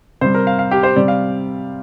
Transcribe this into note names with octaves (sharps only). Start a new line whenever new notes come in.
C3 G3 C5
A#4
F5
F5
G4
C5
C3 G3 D5
F5